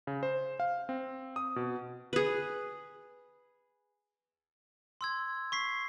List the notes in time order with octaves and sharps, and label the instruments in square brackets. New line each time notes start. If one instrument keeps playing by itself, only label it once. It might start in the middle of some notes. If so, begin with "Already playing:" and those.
[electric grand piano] C#3
C5
F5
C4
D#6
B2
[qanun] G#4 B4
[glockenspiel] C6 E6 G#6
C#6 B6 C7